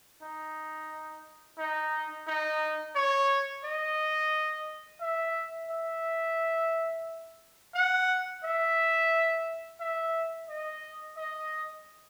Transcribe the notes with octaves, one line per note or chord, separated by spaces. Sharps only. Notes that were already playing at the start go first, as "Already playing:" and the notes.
D#4
D#4
D#4
C#5
D#5
E5
E5
F#5
E5
E5
D#5
D#5